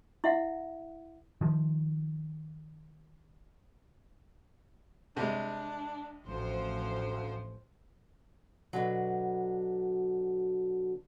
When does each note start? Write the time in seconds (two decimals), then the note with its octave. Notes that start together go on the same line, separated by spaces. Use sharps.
0.24 E4 E5 F#5
1.41 D#3 F3
5.17 C3 G3 G#3 D4
6.26 A1 D2 F3 C5
8.73 B2 D3 F#3